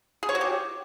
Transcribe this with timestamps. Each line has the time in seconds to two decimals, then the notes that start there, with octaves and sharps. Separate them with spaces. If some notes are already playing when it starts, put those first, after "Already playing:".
0.23 G#4
0.29 C#5
0.35 F#4
0.41 G4